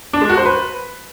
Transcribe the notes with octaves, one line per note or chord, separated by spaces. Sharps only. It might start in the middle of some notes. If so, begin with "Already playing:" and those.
D4
G#3
F#4
C5
B4